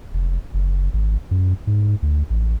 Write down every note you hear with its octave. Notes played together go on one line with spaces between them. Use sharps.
F1
F#1
G#1
F#2
G#2
D2
A1